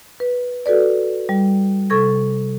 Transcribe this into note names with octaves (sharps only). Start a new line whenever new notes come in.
B4
F#4 A4 B4 D5
G3
C3 A4 C#6 G#6 A#6